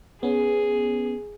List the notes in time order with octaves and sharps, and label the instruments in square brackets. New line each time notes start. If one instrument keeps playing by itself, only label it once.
[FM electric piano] B3 C#4 [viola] G#4